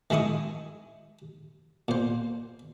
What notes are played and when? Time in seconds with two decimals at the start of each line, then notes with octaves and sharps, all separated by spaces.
0.10 D#3 G#3 E4 C#6 D#6
1.88 A#2 C5